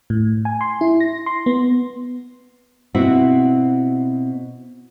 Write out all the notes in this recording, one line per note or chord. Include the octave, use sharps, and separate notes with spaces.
A2
G#5
C6
E4
A#6
C6
B3
B2 C4 E4 F#4